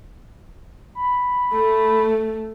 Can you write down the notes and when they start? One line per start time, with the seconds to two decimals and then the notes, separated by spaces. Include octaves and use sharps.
0.95 B5
1.53 A3